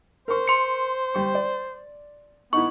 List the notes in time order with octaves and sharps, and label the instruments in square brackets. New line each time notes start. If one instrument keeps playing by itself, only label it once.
[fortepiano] A#4 C#6 [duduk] C5
[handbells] C6 C#7
[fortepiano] G3 C#6
D5
[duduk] B3 [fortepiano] D#4 E4 [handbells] C#6